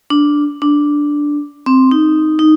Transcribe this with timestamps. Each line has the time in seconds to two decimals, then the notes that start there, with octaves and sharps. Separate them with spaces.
0.10 D4
0.62 D4
1.66 C4
1.91 D#4
2.39 D#4